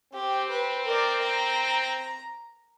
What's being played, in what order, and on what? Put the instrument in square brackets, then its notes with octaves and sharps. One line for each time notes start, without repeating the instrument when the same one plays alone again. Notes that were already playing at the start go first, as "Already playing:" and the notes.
[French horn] C4 [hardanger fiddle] G4
[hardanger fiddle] B4
A#4 D5
A#5